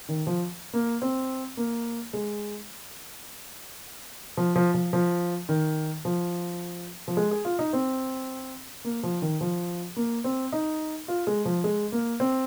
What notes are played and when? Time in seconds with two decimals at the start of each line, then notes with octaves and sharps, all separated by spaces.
0.09 D#3
0.27 F3
0.73 A#3
1.02 C4
1.57 A#3
2.13 G#3
4.37 F3
4.56 F3
4.74 F3
4.93 F3
5.49 D#3
6.05 F3
7.08 F3
7.17 G#3
7.31 G#4
7.45 F4
7.59 D#4
7.73 C4
8.85 A#3
9.03 F3
9.22 D#3
9.41 F3
9.96 A#3
10.24 C4
10.52 D#4
11.08 F4
11.27 G#3
11.45 F3
11.64 G#3
11.92 A#3
12.20 C4